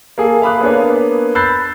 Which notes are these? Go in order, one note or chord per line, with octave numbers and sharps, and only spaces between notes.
A#3 G#4 A4
F5 B5 D6 D#6 F#6
A#3 B3 D4 B4 C#5
B5 E6 F#6 G6 A6 C7